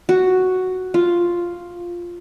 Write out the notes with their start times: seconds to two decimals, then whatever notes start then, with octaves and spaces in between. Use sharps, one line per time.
0.09 F#4
0.94 F4